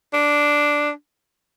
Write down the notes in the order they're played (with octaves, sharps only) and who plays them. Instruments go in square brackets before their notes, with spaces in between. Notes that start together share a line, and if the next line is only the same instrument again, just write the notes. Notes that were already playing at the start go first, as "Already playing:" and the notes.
[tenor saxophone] D4